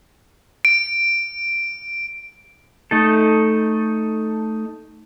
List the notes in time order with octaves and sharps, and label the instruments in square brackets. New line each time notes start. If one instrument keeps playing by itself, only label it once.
[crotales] D7
[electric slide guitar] A3 D#4 A4